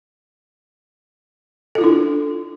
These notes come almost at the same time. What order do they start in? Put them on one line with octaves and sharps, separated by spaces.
A4 F4 E4 D4